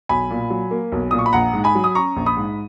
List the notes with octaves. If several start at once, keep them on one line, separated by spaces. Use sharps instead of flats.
B1 G#5 B5
A#2
F#3
A#3
B1
A#2 D#6
C#6
B5
A#1 F#5 A#5
G#2
G#5 B5
F#3
D#6
C#4 A#5 C#6
A#1
B5 D#6
G#2